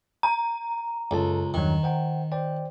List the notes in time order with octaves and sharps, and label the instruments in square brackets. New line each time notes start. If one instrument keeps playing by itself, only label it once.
[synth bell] A#5
[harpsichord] C#2 [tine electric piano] F#2 A4 A5
[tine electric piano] E2 G2 F#3 [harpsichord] D#3
[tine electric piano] C5 F#5 G5
C5 D5 G5